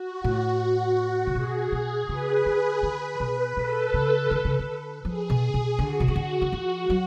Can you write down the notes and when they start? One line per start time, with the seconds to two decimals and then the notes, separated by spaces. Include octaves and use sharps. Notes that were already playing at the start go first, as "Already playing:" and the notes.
Already playing: F#4
0.24 A2
1.27 C#3
1.35 B2 G#4
1.72 B2
2.09 C#3 B4
2.46 D3
2.83 D3 B4
3.20 B2
3.57 B2 A4
3.94 C#3
4.31 D3
4.45 C#3
4.59 D3
5.05 F3 G#4
5.30 B2
5.54 B2
5.79 D3 F#4
6.00 B2
6.08 C#3
6.16 D3
6.42 D3
6.52 F3
6.90 F#3